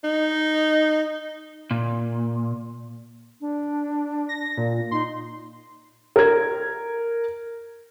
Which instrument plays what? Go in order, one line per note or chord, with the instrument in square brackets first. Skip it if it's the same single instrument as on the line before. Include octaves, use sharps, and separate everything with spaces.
[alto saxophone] D#4
[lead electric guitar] A#2
[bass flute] D4
[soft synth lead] A#6
A#2
[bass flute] D#4 [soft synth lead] C6
[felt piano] A#4 G#6